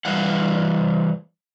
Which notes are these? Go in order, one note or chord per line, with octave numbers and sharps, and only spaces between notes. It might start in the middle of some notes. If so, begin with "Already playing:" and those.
E3 G3 F5 F#5